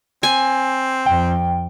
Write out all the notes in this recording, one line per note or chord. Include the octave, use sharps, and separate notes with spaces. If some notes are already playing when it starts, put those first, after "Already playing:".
C4 G#5
F2 G5